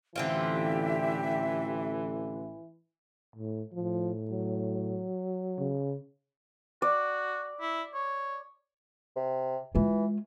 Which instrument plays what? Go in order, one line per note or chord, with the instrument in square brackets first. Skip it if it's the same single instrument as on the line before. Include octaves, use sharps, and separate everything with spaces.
[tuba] A1 [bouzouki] D3 C4 F4 [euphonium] E3 [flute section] G4 E5
[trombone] A2
[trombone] A2 [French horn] F3
[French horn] F#3
[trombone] C#3
[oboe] F#4 [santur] D5
[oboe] E4
C#5
[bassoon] C3
[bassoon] E3 [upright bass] G#3 F4